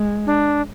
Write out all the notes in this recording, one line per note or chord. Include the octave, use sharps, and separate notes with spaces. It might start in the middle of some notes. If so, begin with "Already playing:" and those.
Already playing: G#3
D4